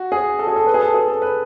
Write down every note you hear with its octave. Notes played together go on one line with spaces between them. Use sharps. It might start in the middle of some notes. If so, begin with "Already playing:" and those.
Already playing: F#4
G#4
A4
G#4
A4
B4
G#4
A4
G#4
A4
B4